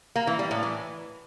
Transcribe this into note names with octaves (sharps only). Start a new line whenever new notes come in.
A#3
E3
G3
A2
E3